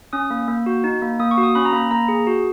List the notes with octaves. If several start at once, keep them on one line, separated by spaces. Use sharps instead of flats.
C#4 D#6
A#3
A#3
F#4
D#4
A#3
A#3 D#6
C#6
F#4
D#6
C#4 B5
A#5
A#3 B5
A#3 A#5
G#4
F#4